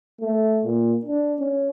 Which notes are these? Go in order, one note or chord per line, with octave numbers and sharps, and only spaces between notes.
A3
A#2
D4
C#4